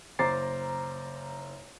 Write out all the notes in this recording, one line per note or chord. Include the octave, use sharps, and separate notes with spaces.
F#1 C5 A#5 D6 A6 C7